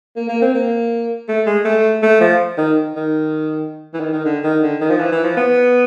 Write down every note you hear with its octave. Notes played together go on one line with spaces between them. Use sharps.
A#3
A#3
C4
A#3
A3
G#3
A3
A3
F3
D#3
D#3
E3
D#3
D#3
D3
D#3
D3
D#3
F3
E3
E3
F3
B3